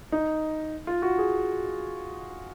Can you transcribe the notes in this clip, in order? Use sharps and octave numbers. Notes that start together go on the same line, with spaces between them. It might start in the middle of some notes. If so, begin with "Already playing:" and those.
D#4
F4
F#4
G#4